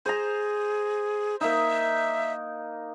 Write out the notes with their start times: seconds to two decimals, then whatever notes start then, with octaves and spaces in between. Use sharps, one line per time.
0.06 G#4 C5 A#5
1.41 A#3 D#4 E5